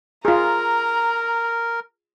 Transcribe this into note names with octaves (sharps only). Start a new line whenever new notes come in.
F4 G#4 A#4 A#5